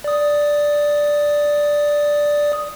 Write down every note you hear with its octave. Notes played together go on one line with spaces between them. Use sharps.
D5 D#6